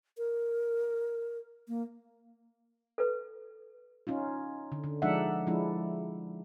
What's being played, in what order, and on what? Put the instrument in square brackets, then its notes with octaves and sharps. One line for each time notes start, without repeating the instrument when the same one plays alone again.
[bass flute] A#4
A#3
[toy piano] A4 B4
[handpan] C#4 D#4 F4
D3
D3
F3 G#3 D4 D#4 E5 F#5
F3 G#3 D4 E4